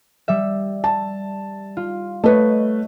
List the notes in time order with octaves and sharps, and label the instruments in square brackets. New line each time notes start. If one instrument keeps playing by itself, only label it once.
[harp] G3 E5
[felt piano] A5
[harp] F4
[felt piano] A3 B4 [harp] C#5 D#5